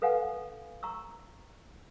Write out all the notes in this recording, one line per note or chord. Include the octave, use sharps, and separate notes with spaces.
A4 B4 F5 F#5 G#5
A#5 C#6 E6